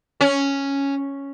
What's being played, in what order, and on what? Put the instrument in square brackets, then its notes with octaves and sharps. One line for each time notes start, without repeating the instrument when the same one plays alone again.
[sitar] C#4